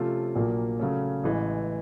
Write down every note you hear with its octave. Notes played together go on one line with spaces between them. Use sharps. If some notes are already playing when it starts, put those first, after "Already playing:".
Already playing: C3 F3 A3 C#4 F4
A#1 A#2 F#3 A#3
C#3 F#3 A3 C#4
A1 A2 E3 G#3